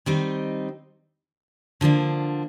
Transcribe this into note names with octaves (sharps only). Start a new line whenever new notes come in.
D#3 G3 C4 D#4
D3 F3 A#3 D4